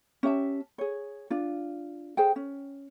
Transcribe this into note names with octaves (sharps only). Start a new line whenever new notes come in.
C#4 G4 E5 A5
G#4 C#5
D4 F4
G#4 C5 G5
C#4